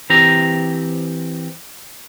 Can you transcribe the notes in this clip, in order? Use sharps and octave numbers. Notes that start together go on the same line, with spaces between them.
E3 C4 G4 A#5